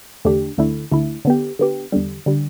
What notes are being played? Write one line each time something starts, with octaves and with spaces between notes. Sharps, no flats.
E2 D3 A3 D4 G4
D2 D3 A3 E4
D2 D3 A3 E4
D3 B3 G4
D3 B3 G4
E2 D3 G3
D3 G3